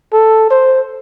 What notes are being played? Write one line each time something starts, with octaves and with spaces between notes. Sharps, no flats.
A4
C5